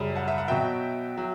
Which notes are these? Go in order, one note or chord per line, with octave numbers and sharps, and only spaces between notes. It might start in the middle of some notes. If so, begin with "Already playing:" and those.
Already playing: F#2 C#3 G3
F#5 A5
E5
F#5
B2 F#3 E5 G5
F#3